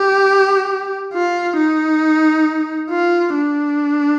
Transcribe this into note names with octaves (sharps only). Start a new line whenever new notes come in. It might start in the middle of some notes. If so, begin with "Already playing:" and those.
Already playing: G4
F4
D#4
F4
D4